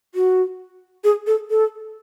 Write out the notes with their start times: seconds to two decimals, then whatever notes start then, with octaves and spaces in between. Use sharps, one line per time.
0.15 F#4
1.04 G#4
1.27 A4
1.50 A4